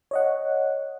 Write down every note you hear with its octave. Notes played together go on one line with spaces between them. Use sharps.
C#5 D#5 F#5